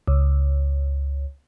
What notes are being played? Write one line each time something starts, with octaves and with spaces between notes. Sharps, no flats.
C#2